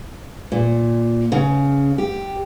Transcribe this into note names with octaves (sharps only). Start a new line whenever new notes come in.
A#2
C#3
G4